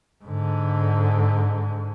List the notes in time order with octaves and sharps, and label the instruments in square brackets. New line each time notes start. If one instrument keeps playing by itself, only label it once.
[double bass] G#2 D3